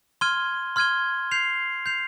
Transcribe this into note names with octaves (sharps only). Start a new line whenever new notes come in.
C6 F6 G#6 D#7 G7
C6 F6 G#6 D#7 G7
G6 C7 F7
G6 C7 F7